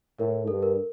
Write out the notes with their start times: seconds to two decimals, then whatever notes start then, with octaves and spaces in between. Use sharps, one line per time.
0.20 A2 A#4
0.47 G2 A4
0.62 A#4